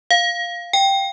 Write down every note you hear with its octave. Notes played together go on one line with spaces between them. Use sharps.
F5
G5